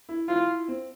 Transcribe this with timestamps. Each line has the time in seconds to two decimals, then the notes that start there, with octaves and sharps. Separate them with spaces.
0.09 E4
0.28 E4 F4
0.68 C4